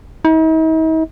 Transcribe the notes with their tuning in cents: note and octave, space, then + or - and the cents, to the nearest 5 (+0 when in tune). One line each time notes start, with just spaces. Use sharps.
D#4 +45